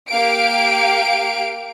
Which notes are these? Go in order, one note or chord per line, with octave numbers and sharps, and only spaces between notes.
A#3 G4 F5 D7